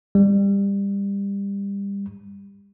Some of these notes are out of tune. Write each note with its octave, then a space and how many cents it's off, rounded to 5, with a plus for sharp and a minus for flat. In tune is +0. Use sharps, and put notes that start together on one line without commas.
G3 +25